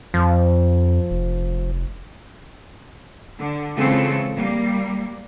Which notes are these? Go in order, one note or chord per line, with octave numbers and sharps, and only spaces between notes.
F2 F3
F1
D3
C#3 E3 G#3 C4 F4 A4
G3 A#3